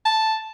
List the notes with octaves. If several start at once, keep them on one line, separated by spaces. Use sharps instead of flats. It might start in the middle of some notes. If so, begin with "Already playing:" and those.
A5